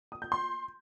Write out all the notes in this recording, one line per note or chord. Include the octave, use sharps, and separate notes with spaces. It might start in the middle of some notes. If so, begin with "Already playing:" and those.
D#6
G6
C6